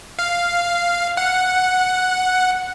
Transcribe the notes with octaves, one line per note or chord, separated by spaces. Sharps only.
F5
F#5